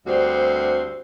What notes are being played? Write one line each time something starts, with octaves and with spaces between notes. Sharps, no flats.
D2 G2 G3 C4 F#4 C5